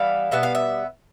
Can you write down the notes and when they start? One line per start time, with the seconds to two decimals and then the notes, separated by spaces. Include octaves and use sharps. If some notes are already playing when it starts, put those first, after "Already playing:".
Already playing: E3 G3 B3 F5
0.31 B2 G3 B3 E5
0.43 F5
0.55 E5